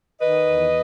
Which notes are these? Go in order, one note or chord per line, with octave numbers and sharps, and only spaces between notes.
D#3 B4 D#5
E2